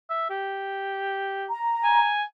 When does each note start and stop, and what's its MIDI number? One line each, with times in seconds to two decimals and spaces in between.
0.10 0.29 76
0.30 1.49 67
1.49 2.09 82
1.84 2.23 80